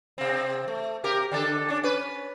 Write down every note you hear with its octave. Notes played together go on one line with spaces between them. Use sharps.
C3 C4
A3
C3 G4 A#4
D3 D4 A4
C#4 D4
C#4 B4